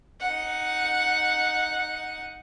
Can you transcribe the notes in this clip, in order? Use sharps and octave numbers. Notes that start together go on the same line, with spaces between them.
D#4 F#5